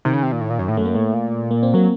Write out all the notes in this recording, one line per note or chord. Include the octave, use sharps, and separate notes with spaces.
C3 D#3
C#3
C3
A#2
A2
A#2
F#2
A2
F#2 A3
A#3
A2 A3
A#2
A#3
C4
F#3 A#3